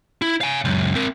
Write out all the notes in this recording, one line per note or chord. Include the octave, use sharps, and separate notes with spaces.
E4
F5 G#5
C#2 F#2
C4 A#4